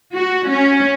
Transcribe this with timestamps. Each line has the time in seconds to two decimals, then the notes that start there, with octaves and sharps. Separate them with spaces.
0.15 F#4
0.49 C#4